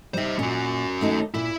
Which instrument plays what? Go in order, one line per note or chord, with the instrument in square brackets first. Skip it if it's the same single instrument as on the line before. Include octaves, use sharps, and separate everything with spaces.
[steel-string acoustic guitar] G3 D#4 [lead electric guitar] C5 E5
[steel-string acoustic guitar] A#2 [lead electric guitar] C#4 F#4
[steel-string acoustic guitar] D#2 A3 D#4
[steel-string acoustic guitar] A#2 [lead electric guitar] E4